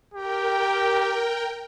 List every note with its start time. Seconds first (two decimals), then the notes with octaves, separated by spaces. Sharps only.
0.14 G4 A#4 G5